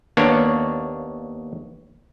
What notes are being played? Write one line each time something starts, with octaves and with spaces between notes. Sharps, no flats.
D#2 A#3 B3 D4 C#5